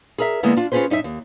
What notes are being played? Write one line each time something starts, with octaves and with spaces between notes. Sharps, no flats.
G#4 A#4 E5
D3 G#3 A#3 B3 E4
D4 F4
C#4 F4 G4 G#4 B4 C5
F#2 D#4 G4 E5
D#2